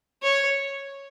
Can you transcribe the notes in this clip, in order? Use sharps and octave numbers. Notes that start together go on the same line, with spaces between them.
C#5